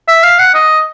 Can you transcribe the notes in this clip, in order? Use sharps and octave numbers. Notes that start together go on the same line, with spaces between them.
E5
F5
F#5
D#5